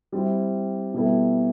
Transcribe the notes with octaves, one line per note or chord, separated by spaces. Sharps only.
G3 C4 E4
B2 G3 B3 E4 A4